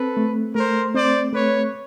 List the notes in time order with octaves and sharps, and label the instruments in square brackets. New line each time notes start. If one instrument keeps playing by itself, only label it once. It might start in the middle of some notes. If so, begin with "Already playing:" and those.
Already playing: [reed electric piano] C4 [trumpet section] A4 B4
[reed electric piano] A3
[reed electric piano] A3 [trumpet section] A#4 C5
[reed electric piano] C4 [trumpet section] C5 D5
[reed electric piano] A3 [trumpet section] B4 C#5